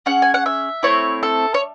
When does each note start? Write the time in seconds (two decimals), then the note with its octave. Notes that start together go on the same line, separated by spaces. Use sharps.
0.06 C#4 G#4 F#5
0.22 G#5
0.34 F#5
0.46 E5
0.83 A3 C4 E4 C#5
1.23 A4
1.54 C#5